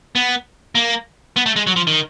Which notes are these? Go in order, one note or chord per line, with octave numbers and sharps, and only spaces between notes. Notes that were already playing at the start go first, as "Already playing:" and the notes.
B3
A#3
B3
A3
G#3
F#3
F3
D#3